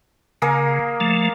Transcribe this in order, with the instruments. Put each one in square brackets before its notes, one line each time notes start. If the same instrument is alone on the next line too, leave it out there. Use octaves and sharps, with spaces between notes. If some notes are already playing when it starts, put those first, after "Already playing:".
[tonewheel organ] C#3 [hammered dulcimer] A#3 G#4 A#4
[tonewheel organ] F3 A3